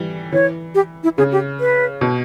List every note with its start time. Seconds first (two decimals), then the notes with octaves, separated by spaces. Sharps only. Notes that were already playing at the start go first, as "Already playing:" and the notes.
Already playing: E3 G3
0.32 E3 C#5
0.75 G4
1.03 E4
1.18 C#3 G#4
1.32 G4
1.60 B4
2.01 B2